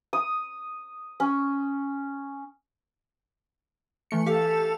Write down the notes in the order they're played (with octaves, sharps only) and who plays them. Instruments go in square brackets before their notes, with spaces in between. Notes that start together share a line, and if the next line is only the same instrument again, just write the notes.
[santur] D#6
C#4
[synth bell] E3 A3 C#7
[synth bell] G4 F5 [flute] A4